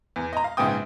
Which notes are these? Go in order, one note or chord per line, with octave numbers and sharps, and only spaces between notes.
E2
D#5 A#5
F5
A#1 G#2 C#3 B3 G5 D#6